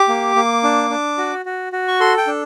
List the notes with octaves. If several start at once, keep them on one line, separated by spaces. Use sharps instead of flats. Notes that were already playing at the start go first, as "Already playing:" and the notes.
Already playing: G4 D6
A#3
A#3
D4
D4
F#4
F#4
F#4
C#6
A4 C6
G5
D4